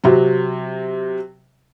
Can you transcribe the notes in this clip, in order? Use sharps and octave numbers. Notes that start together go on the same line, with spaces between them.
C3 F#3